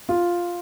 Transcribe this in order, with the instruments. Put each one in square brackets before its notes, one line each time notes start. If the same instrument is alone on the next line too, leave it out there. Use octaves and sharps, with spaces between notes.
[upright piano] F4